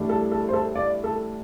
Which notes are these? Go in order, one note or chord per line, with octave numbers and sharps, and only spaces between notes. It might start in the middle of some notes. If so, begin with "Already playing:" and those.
Already playing: A1 A2 G3 D4
A4
A4
C5
A4
D5
A4